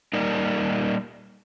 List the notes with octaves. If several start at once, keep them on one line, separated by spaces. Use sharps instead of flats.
G3 A#3 D#4 A#4 D5